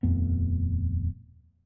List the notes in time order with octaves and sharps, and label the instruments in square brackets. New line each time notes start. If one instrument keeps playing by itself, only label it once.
[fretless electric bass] D#1 F2 A3 B3